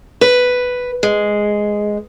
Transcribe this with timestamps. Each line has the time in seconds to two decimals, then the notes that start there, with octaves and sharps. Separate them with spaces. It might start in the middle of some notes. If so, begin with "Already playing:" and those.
0.21 B4
1.03 G#3